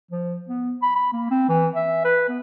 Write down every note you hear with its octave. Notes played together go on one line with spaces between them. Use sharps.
F3
B3
B5
B5
A#3
C4
E3
E5
B4
B3